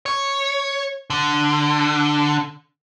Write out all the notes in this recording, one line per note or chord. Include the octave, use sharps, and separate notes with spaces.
C#5
D3